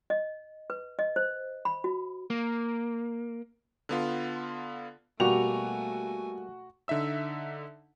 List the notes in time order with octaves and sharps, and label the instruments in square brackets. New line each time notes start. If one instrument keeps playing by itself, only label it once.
[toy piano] D#5
B4
D#5
C5
B5
F#4
[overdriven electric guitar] A#3
[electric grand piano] D3 B3 F4
[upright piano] B2 [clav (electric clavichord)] G3 A#3 G4 [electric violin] A3 G#5 [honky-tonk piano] F#4 F7
[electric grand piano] D3 D#4 E5 E6